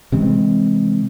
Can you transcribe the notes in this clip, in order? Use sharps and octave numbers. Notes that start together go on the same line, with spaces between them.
C3 E3 G#3 C4